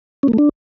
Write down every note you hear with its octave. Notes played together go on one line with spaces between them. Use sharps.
C#4
A#3
A3
D4